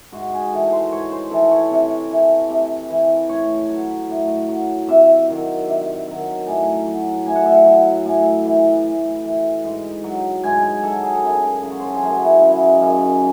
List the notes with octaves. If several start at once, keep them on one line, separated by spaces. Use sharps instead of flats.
G#2 F#4
G#4
E3 A4
C5
G#2 C#5
C5
E3 A4
C#5
C3
E3
C3
E3
A2 C#5
F#3
A2
F#3
C3 E5
D#3 F#3
C3
D#3 F#3
A5
A2 G#5
F#3
A2 G#5
F#5
E5
F#5
F#3
A2 G#5
E3
A2
E3
G#2
F#3
G#2 G#5
G#5
F#3 A4
G#4
A4
F#2 G#4
C#3 F#3
C#5
C5
A4
G#4
F#2 F#4
E4
C#3 F#3
E4
D#4
F#2 C#4